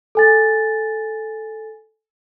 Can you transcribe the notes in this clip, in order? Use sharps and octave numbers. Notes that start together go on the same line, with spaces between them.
A4 G#5 A6